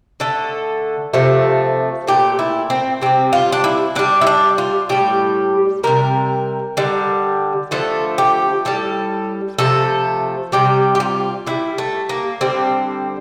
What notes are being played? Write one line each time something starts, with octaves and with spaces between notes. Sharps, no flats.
D3 A3 A4
C3 F3 A3
A#2 A3 G4
E4
C4
C3 G3 C4
F4
D4
E4
D3 G3 D4
E4
D4
F4
A2 G3 G4
C3 E3 G3 A#4
D3 G3
D3 F3 A3 A4
G4
A2 G3 A4
C3 F3 A3 A4
C3 G3 G4
G4
F4
D3 G3 E4
A3
A#3
D3 G3 C4